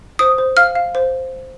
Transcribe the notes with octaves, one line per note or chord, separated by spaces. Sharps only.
C5 D#6
C5
F5 F6
F5
C5